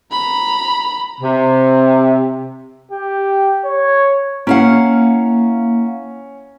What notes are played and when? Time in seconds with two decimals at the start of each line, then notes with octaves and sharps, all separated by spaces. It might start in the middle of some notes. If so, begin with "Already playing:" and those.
0.12 A#5 B5
1.21 C3
2.91 G4
3.64 C#5
4.47 A#3 C#4 E4 F5 F#5